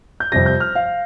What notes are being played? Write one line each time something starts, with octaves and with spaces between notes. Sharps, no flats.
G6
F2 C3 G3 A#6
G6
F6
F5